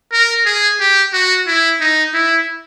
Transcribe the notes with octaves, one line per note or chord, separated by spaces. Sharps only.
A#4
G#4
G4
F#4
E4
D#4
E4